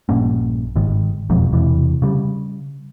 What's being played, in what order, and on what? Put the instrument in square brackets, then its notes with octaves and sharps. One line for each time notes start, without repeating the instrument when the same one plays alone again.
[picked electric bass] A#1 G2 A#3 C#4
G1 G#2 D#3
E1 B1 F2 G#2
E1 E2 C3 E3
C#3 G3